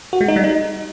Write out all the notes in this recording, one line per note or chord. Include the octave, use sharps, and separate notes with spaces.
F#4
G#3
D#4
G3
D#4